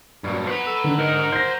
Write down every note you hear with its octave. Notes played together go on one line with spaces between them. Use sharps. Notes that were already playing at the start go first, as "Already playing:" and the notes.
G2 A#2 F#3
B3 B4 C5 F#5 A#5
A4
D3 D#3
G#2 D#4 A#4
C5 G6 A#6